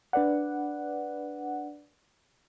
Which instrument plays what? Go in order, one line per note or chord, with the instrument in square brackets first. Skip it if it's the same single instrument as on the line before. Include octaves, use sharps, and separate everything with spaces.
[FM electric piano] D4 B4 D5 F#5